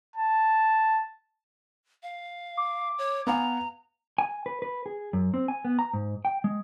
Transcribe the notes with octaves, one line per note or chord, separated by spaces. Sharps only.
A5
F5
D6
C#5
B3 F5 G#5 A#5
G#5
B4
B4
G#4
F#2
C4
G#5
B3
A#5
G#2
G5
G#3